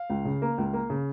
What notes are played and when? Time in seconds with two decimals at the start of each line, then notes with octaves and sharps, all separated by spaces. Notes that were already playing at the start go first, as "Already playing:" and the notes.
Already playing: F5
0.10 C#2
0.25 C#3
0.42 A#3
0.58 C#2
0.73 A#3
0.90 C#3